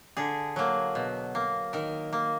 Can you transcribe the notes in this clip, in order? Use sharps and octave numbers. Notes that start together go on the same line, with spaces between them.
D3 G#4
F#3 A#3
B2
A#3
D#3 A#4
A#3